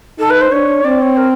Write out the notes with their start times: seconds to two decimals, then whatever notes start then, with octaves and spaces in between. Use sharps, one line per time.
0.19 D#4 A4
0.30 B4
0.41 C5
0.51 D4 C#5
0.84 C4 D5
1.01 C#5
1.17 A#4